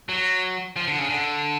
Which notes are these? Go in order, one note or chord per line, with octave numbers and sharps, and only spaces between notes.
F#3
F3
D3
C#3
D3